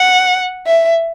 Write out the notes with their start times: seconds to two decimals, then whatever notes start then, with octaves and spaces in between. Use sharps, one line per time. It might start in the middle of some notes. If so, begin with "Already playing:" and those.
Already playing: F#5
0.67 E5